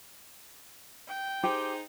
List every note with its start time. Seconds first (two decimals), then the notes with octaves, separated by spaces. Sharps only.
1.08 G5
1.44 D#4 G4 G#4 C5